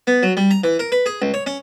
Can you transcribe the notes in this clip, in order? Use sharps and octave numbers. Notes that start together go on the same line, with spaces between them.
B3
F#3
G3
A#5
E3
A#4
B4
G#4
C#2
C#5
C#4